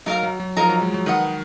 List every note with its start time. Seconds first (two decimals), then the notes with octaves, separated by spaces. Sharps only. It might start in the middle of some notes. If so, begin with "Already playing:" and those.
0.06 F#3 D#4 A#4 F5 A#5
0.23 F#3
0.40 F#3
0.56 F3 D#4 A#4 F5 A#5
0.69 F#3
0.82 G#3
0.94 F#3
1.06 D#3 B4 D#5 F#5